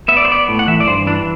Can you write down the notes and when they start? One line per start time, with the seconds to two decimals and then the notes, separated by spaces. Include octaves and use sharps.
0.08 B3 E5
0.17 D5
0.25 C5
0.28 B3 D5
0.48 A2
0.59 F#5
0.67 E3 E5
0.80 D5
0.87 G2 C5
1.07 E3 D4